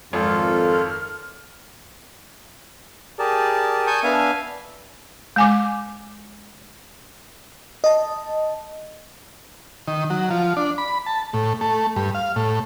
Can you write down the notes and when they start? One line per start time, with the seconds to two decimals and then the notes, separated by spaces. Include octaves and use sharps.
0.13 G#1 F2 F4 A4 A#4 F6
3.19 G4 G#4 A#4 D5 A5
3.87 G#5 A5 C#6 D#6 G6
4.03 B3 D4 E5 F5 G#5
5.36 G#3 G#5 D6
7.84 D#5 A5
9.87 D#3
10.10 F#3
10.30 F3
10.57 D4
10.78 B5
11.06 A5
11.33 A2
11.61 A3
11.96 G2
12.15 F5
12.36 A2